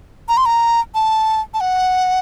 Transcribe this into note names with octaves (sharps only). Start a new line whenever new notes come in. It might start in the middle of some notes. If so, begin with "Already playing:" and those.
A#5
C6
A#5
A5
A5
F#5